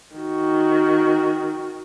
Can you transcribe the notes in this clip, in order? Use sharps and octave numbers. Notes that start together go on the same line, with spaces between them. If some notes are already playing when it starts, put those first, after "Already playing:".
D#3 F#4